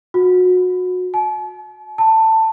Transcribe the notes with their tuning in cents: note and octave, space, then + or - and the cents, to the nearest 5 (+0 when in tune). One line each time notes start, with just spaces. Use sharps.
F#4 -25
A5 -45
A5 +15